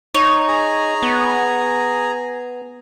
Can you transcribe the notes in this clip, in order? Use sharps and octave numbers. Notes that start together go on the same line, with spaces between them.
D#4 C#5
G#4 G#5 A#5
B3